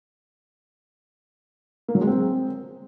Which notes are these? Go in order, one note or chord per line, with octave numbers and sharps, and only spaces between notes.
A#3
F#3
G#3
C4